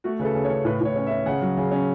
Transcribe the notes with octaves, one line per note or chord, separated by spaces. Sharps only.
A3 F#4
C#3 B4
A4
C#3
C#5
C#3
A2 B4
A2 C#5
C#4
E5
C#4
C#3 F#5
F#3
C#3
C#4